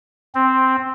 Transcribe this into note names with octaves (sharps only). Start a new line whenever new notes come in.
C4